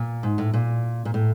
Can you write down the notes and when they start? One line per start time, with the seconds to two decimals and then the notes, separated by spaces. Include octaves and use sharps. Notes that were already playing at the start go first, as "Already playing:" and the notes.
Already playing: A#2
0.23 G#2
0.38 A2
0.54 A#2
1.05 A#2
1.14 A2